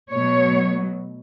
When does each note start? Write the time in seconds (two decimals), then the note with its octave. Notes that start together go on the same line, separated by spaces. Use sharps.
0.12 B2 F#3 A3 C#5